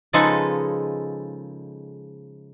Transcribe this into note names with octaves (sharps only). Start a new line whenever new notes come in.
C#3 F3 G#3 D#4 A4 B4